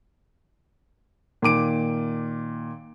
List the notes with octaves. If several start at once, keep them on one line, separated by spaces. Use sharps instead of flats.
A#2 D#3 D6 D7